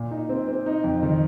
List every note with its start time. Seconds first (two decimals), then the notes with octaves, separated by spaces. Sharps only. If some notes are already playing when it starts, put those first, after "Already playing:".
Already playing: A#2
0.11 D#4
0.29 C4
0.48 C4
0.66 D#4
0.84 F2
1.03 D#3